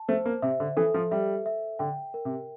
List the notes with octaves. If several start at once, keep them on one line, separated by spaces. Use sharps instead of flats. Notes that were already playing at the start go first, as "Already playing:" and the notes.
Already playing: A5
A3 C5
A#3
C3 E5
D3
E3 A4
F3
G3 E5
E5
D3 G5
A#4
C3